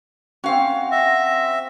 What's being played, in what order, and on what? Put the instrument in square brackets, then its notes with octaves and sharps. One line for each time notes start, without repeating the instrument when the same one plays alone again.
[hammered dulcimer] C4 F#4 [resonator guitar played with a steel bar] C#4 F5
[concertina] E5 [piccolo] A#6